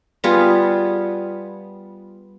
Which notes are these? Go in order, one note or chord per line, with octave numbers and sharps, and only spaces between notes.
G3 B3 F4 G#4